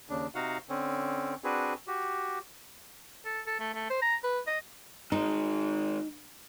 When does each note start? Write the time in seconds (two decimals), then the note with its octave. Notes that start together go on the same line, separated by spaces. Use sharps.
0.09 D#2 C#3 D4
0.35 C3 D#4 F#4 F5 F#5
0.69 D3 C4 C#4
1.44 C4 D4 F#4 G#4 B4
1.87 F#4 G4
3.25 A4
3.47 A4
3.60 A3
3.74 A3
3.89 C5
4.02 A#5
4.23 B4
4.47 D#5
5.12 D#3 G#3 D#4